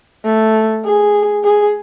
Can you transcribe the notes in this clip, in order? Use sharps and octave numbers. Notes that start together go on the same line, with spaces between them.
A3
G#4
G#4